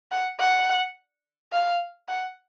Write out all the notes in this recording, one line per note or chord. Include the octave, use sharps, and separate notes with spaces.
F#5
F#5
F5
F#5